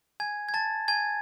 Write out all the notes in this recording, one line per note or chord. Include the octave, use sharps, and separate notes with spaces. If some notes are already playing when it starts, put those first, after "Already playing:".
G#5 G#6
G#6
A5 A6
G#5 G#6